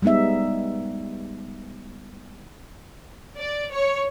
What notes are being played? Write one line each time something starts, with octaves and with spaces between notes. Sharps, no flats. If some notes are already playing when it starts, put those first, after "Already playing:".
G3 G#3 B3 D#4 E5
D5
C#5